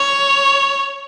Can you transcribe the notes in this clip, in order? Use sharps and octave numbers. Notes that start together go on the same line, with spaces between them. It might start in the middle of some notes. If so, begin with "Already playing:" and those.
Already playing: C#5